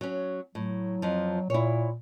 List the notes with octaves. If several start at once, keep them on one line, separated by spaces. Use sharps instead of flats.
F#3 C#4
A2 F#3
F2 F3
A#2 E4 C#5